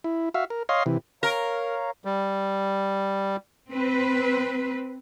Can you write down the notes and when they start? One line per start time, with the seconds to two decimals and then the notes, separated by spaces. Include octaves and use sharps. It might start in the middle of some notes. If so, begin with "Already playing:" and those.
0.04 E4
0.34 F#4 E5 F5
0.50 A#4
0.69 C#5 D#5 F5 C6
0.86 C3 E3
1.23 A#4 C#5 F5 A#5
2.05 G3
3.72 C4 B4